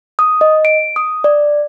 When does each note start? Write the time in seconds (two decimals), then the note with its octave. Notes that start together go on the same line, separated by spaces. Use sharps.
0.19 D#6
0.41 D#5
0.65 D7
0.96 D#6
1.24 D5